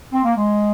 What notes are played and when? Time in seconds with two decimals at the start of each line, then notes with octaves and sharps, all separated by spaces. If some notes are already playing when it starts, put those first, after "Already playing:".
0.12 C4
0.24 A#3
0.36 G#3